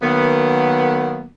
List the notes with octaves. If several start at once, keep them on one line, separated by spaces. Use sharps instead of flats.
D#3 F#3 A#3 B3